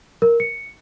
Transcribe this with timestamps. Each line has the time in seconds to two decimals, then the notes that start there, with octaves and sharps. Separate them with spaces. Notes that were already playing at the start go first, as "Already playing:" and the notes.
0.22 A#4
0.40 C#7